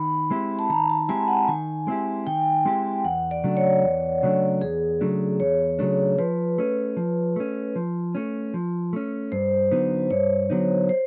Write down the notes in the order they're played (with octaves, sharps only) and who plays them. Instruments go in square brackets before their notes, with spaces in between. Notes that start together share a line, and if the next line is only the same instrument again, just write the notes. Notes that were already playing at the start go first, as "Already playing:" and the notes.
Already playing: [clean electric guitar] D#3 [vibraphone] B5
[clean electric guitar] G#3 C4 E4 G4
[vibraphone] A5
[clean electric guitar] D#3 [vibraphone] A#5
[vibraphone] A5
[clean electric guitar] G#3 C4 E4 G4 [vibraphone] G#5
[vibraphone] F#5
[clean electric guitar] D#3 [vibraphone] G#5
[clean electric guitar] G#3 C4 E4 G4
[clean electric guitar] D#3 [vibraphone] G5
[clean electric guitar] G#3 C4 E4 G4
[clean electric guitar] E2 [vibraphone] F#5
[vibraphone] D5
[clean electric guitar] C#3 F#3 A3 D4
[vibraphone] C#5
[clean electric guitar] E2
C#3 F#3 A3 D4
[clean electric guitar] E2 [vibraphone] G#4
[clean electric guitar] C#3 F#3 A3 D4
[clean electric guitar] E2 [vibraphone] C#5
[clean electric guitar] C#3 F#3 A3 D4
[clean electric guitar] F3 [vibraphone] B4
[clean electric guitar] A3 C#4
F3
A3 C#4
F3
A3 C#4
F3
A3 C#4
[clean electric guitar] G2 [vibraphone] C5
[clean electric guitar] D3 F#3 B3 D#4
[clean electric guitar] G2 [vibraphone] C#5
[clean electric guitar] D3 F#3 B3 D#4
[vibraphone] C5